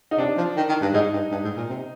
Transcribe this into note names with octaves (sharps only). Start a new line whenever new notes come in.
D#4
C3 D4
F3
D#3
D#3
G2
G#2 D#4
G2
G2
G#2
A#2
C3